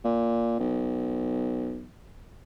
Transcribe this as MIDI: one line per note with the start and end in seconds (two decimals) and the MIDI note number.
0.04 0.57 46
0.59 1.85 35